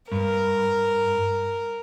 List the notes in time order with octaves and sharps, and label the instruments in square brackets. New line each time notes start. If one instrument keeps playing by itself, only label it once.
[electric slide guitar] G2 [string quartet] A#4